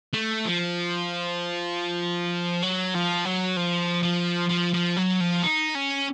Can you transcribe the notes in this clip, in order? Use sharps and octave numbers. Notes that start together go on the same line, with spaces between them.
A3
F3
F#3
F3
F#3
F3
F3
F3
F3
F#3
F3
D#4
C#4